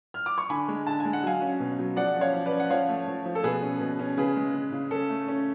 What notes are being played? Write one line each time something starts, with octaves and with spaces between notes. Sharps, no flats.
F6
D6
C#6
D3 G#5 B5
G#3
D3 A5
G#5
G#3
F#5
F#3 F5 G#5
C#4
B2
F#3
F3 D5 F#5
C#4
C#5 F5
F3
B4 D5
C#4
F#5
F3 C#5 F5
A3
F3
F3
A4
B2 G#4 B4
C#4
B2
C#4
C#3 G#4 B4
G#3
C#3
C#3
C#4 A4
A3
C#4